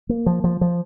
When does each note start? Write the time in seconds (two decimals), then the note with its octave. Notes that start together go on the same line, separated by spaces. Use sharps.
0.09 A#3
0.26 F3
0.44 F3
0.61 F3